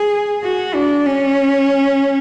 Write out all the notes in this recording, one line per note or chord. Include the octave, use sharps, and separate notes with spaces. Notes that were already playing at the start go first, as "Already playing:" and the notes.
Already playing: G#4
F#4
D4
C#4